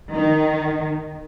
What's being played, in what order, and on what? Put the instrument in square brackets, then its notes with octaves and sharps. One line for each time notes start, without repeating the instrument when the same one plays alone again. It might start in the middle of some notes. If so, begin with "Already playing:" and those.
[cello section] D#3